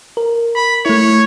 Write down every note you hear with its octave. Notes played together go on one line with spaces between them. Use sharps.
A#4
B5
A3 E4 C#5